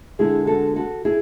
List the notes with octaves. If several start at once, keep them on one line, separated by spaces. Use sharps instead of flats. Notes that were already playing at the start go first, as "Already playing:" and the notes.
D3 G#3 B3 E4 G#4
F#4 A4
F#4 A4
E4 G#4